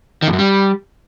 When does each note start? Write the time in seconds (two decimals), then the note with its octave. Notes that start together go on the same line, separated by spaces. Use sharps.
0.22 D#3
0.28 F2
0.33 F#2
0.38 G3